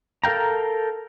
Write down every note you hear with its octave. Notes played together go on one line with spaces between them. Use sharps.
A4 A#4 F5 G5 A#5